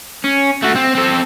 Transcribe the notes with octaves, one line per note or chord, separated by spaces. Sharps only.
C#4
A3 F#4
C4
C4 A4